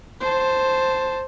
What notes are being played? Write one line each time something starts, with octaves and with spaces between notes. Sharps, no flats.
C5 A5